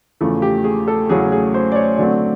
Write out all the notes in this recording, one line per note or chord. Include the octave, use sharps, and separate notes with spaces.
E2 C#3 F3 A3
G4
G#4
A4
E2 C#3 F#3 A3 C#4 G#4
G#4
C5
D5
C#5
D3 F#3 A3 C4 D5